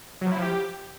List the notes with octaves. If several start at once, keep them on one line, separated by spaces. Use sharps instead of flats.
F#3
F3
E4
F3
G4